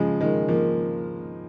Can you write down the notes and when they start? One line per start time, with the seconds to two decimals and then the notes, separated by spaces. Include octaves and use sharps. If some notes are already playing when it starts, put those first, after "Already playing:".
Already playing: C#3 F3 G#3
0.21 D#3 G#3
0.49 F3 A#3